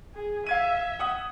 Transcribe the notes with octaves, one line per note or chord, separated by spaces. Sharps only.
G#4
E5 F5 G#6 D#7
F#5 D#6